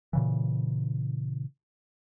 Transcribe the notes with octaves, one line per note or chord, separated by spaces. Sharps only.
A#2 C#3 E3